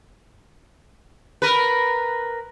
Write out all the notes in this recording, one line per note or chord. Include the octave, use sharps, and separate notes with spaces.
A#4 B4